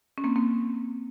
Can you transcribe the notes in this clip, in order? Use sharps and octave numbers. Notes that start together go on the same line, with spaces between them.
C#4
A#3 C4
A#3 C4